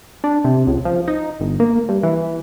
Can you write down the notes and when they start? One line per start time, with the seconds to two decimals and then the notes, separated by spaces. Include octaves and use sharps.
0.24 D4
0.44 C3
0.67 C#2
0.85 F3
1.08 D#4
1.40 G1
1.60 A#3
1.89 G2
2.03 E3